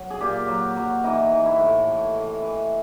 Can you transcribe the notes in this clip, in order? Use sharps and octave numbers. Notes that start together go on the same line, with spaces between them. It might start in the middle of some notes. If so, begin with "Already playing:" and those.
Already playing: F#3
G#4
A#2 G4
F#3
F#3
E3 D#4
E3
E4
A2
A2
E3
E3